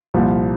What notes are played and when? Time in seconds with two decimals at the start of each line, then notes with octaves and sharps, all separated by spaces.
0.14 C2 A#2 F3